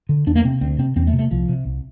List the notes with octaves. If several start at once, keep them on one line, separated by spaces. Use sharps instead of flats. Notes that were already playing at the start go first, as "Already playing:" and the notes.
D3
E2 D4
A#3
C3 C4
D2 C4
C3 C4
E2 C4
A3
C3
A3
C2 F3
C3
C2